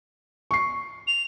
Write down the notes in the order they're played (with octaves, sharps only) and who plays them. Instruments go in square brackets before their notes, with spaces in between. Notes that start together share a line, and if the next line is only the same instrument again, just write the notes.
[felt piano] C#6 C7
[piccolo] F7